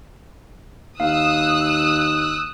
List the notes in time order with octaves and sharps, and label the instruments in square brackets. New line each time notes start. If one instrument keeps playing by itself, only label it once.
[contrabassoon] D#2 [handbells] F5 [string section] D#6 E6 F#6